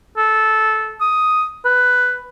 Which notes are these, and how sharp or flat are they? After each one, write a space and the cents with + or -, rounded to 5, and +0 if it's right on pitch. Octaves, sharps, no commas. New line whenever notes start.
A4 -15
D#6 +5
B4 +10